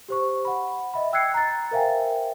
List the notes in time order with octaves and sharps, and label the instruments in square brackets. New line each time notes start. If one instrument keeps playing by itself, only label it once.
[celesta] G4 C5 C#6
F#5 B5
D#5 E5 B5
G5 E6 F#6 G#6 C7 C#7
A#5 A6
A#4 C5 E5 F5 G5 G#5